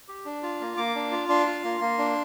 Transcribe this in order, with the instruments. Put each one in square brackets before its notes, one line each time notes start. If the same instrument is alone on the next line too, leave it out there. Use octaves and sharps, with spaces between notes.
[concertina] G4
D4
F4
A#3
A#3 D6
D4
F4
D4 C6
F4
A#3
A#3
D4